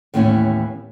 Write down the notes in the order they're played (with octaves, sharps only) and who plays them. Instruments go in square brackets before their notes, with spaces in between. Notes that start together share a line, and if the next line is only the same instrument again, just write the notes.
[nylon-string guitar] D#2 A2 E3 B3 C#4 E4